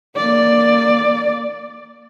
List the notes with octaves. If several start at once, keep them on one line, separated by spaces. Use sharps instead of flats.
A#3 D5